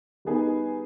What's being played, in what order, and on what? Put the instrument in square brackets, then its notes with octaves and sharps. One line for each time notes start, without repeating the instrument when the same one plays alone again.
[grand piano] G3 B3 D#4 G#4 B4